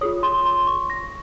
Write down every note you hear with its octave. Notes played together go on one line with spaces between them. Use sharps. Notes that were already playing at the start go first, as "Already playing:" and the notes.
F4 G#4 C#5 D#6
C6
C6
C#6
A#6